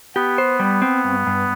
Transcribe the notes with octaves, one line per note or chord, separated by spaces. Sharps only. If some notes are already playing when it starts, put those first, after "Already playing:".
B3 G4
C5
G3
C4
G2
G2